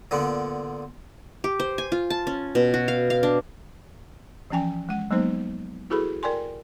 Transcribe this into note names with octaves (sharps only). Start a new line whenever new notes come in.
A#2 D3 B3
G4
C5
G#5
F4
A5
C#4
B2
F#4
F5
F5
D4
E3 F3 C#4 G5 G#5
G#3 F#5
F#3 G#3 A#3 B3 D#4 C5
E4 F#4 G#4 A4 B4 B5
A#4 D5 G5 G#5 C6